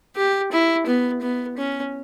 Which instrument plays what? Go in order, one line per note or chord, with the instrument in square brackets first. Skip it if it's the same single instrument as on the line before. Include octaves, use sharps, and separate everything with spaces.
[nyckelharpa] G4
E4
B3
B3
C#4